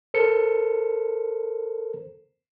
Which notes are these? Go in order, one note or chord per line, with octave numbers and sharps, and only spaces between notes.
A4 A#4 C5 C#7